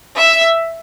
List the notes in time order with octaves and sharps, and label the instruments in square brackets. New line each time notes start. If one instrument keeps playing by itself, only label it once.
[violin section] E5